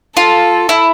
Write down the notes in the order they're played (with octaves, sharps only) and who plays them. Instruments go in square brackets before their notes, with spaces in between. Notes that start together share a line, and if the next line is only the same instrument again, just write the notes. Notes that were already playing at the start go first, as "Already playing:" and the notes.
[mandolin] F4 [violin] A4
[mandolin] E4